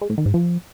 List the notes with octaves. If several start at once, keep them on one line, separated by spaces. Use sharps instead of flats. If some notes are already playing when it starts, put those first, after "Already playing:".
G#3
A2
D#3
G#2
F3